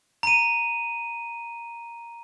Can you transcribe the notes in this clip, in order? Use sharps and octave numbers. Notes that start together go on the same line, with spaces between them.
A#5 D#7